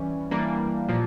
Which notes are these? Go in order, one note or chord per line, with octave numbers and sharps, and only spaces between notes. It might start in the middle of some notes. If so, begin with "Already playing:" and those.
Already playing: E3 G3 C#4
E3 G3 A#3 D4
A#2 F3